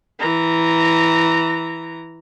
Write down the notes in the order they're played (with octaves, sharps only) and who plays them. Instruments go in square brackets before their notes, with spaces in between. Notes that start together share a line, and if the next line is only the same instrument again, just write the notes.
[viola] E3 A#5